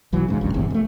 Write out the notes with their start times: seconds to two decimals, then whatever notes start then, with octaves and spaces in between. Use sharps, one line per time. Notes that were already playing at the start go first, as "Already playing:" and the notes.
0.13 B1 E3 F#3
0.28 F2 G#2 C#3
0.41 G#1 D2 G2
0.54 D1 G1 E2 C3
0.70 C3 A3